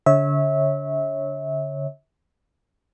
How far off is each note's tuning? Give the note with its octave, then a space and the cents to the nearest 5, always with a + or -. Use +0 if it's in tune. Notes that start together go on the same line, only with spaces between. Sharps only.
D3 -40 C#5 -15 E5 -25